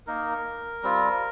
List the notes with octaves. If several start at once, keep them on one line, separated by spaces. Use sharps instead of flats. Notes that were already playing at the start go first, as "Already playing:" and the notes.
A#3 D#4 A#4
G3 C4 F4